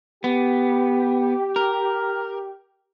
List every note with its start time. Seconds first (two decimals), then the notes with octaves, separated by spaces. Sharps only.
0.24 B3 G4
1.56 A#4